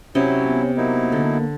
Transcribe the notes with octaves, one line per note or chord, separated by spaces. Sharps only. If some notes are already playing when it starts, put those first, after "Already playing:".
C3 F#3 C#4 E4 D#5
B3
F#3 A#3 D#4 E4
D3